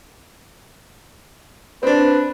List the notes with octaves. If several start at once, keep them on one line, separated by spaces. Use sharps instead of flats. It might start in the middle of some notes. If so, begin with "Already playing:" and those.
C4 D4 B4